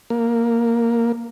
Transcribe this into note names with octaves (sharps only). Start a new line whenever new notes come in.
A#3